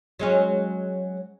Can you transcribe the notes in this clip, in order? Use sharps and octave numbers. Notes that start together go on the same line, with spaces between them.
F#3 G#3 C#4